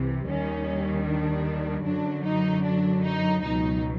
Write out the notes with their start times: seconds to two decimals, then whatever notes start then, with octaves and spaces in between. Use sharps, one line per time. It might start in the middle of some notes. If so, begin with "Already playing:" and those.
Already playing: C2 C3 E3
0.27 D#2 D#3 G3 C#4
1.07 D4
1.86 F#2 D3 F#3 D4
2.25 D#4
2.65 D4
3.05 D#4
3.44 C#2 B2 F#3 D#4